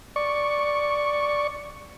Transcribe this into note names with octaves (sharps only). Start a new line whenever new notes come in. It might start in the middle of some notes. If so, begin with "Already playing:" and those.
D5 C#6